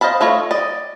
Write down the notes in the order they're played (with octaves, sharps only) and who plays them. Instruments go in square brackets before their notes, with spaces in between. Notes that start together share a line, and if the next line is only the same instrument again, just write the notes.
[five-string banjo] C5 D#5 F5 A5 B5
A3 F4 C#5 D#5
D5 D#5